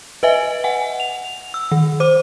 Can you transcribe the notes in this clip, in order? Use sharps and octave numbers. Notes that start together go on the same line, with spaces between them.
B4 D#5 E5 G#5
F#5 G#5
F7
E6
D#3
C5 D6